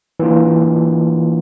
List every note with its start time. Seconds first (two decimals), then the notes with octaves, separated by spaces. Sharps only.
0.20 E3 A#3 D4 F4